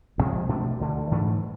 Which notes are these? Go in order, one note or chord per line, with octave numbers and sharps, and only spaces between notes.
D2 C3 F3 G#3
B2 A3 D4
D2 D3 A3
G#2 E3 A3 D4